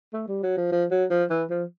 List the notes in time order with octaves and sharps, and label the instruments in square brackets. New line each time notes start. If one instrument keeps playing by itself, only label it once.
[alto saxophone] A3
G3
F#3
F3
F3
F#3
F3
E3
F3